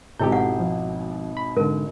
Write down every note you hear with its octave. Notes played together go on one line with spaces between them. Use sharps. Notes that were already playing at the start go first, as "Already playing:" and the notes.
G#1 B2 E4 G4 A4 G6
F#5
F3
B5
G#2 D3 A#4